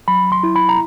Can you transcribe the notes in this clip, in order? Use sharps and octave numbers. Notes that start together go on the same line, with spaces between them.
F#3 B5
C6
E4
B5
A#5